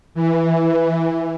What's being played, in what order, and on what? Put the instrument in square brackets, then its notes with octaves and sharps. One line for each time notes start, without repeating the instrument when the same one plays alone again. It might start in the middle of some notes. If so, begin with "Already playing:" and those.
[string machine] E3